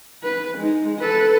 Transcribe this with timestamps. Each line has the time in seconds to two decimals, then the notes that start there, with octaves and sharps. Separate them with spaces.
0.24 B4
0.58 G#3 D#4
0.99 A4 B4